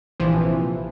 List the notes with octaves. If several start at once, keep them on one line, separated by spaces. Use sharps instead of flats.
A#1 C3 E3 F3